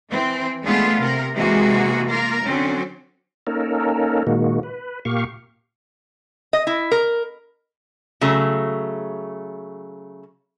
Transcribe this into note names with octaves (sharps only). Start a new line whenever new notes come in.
E3 C4
G#3 A3 B3 D4 F4 G#4
C3 A#4
C3 E3 G#3 A#3 F#4 G#4
A#3 F4 A#4
D3 F#3 C4 C#4
A#3 C#4 D#4 A4 A#4
A#2 D#3 G#3 A#3 F#4
B4
A#2 A#3 G4 F5 C#6
D#5
E4
A#4
C#3 F#3 A3